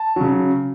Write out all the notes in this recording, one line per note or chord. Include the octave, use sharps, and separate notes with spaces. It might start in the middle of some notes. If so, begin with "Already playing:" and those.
Already playing: A5
C#3 F#3